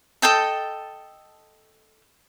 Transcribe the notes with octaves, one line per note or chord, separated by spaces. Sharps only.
A4 D#5 G5 A5